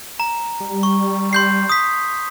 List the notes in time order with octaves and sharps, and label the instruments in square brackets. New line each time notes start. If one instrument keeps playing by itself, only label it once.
[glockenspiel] A#5
[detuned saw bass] G3
[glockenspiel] C#6
C6 G6 C7
D#6 B6